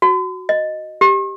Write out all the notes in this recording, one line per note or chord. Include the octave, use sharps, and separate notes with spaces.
F#4
D#5
G4